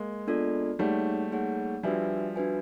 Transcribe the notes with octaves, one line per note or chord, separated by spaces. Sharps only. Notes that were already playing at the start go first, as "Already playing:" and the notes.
Already playing: G#3 A#3
B3 D4 F4 A4 D5
G3 A3 A#3 D#4 G#4 C#5 F#5
A#3 D#4 G#4 C#5 F#5
F3 G3 D4 F#4 B4 E5 G#5
D4 F#4 B4 E5 G#5